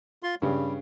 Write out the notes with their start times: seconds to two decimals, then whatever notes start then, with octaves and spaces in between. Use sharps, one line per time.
0.23 F4 C6
0.42 G2 C#3 G3